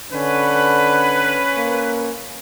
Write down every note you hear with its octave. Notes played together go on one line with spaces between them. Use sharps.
D3 C#4 B4
A#3